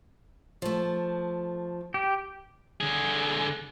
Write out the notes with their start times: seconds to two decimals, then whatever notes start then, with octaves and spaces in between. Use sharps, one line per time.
0.62 F3 A3
1.94 G4
2.80 D3 G#4